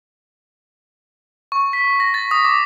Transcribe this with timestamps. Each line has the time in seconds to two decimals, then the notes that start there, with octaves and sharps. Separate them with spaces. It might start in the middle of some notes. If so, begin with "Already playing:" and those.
1.52 C#6
1.73 B6
2.00 A#6
2.14 A6
2.31 D#6
2.45 D6